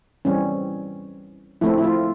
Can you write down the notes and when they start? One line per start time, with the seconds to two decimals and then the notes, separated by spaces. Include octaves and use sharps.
0.25 E3 G3 C4 C#4
1.61 F3 A3 C4 E4
1.78 E4
1.84 F4